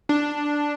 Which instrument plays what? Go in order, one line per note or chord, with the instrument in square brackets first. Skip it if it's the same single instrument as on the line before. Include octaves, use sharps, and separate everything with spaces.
[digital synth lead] D4